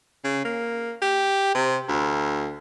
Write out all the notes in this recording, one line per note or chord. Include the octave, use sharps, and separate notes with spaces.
C#3
A#3
G4
C3
D2